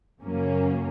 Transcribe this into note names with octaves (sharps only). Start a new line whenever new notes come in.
F#2 C#3 F#3 A#3 C#4